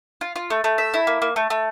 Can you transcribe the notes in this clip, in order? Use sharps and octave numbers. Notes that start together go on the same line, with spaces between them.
F4
F4
A3
A3
E5
E4
A#3
A#3
A3
A3